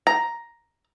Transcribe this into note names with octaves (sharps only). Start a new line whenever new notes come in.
A#5